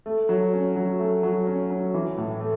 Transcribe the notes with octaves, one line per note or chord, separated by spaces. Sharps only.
A3
F#3
C#4
F#3
A3
F#3
C#4
F#3
E3
A2
A3